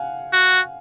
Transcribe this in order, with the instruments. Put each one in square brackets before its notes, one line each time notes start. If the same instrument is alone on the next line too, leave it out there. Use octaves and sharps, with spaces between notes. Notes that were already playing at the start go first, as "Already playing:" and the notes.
Already playing: [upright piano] F5 F#5 G#5
[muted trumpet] F#4